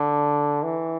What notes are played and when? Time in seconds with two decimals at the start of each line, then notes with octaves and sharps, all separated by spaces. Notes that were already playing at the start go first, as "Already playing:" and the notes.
Already playing: D3
0.63 E3